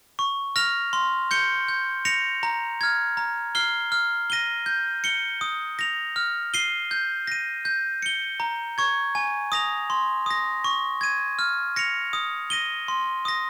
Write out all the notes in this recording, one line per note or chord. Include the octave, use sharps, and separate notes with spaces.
C#6
F6 A#6 F7
C6
G6 C#7 G7
G6
A#6 C#7 F7
A#5
F6 G#6
A#5
F6 C7 G7
F6
A#6 D#7 G7
G6
C#7 G7
D#6
A#6 F7
F6
C7 D#7 G7
G6
A#6 D#7
G6
C#7 G7
A#5
C#6 G#6
G#5
D#6 A#6 F7
C6
D#6 A#6
C#6
G#6 D#7
F6
A#6 C#7 F7
D#6
A#6 D#7 G7
C6
D#6 A#6